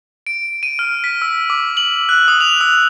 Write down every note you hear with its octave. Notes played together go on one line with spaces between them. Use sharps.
D7
D#7
F6
B6
E6
D6
F#7
F#6
D#6
F7
E6